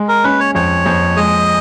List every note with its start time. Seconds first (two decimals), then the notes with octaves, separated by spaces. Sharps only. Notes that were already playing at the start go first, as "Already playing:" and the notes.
Already playing: G#3
0.09 A#4
0.24 C#4 B4
0.40 C#5
0.55 F2 C#5
0.86 F2
1.17 G#3 D#5